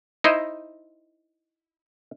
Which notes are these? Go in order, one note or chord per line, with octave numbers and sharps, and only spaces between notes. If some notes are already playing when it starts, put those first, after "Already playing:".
D#4 E4 C5 D#5